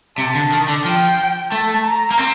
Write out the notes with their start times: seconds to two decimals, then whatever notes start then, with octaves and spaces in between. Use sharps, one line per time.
0.18 C3 A5
0.35 D3
0.52 D#3
0.68 D3
0.84 F3 G5
1.51 A3 A5
1.85 A#5
2.11 A#3
2.18 C4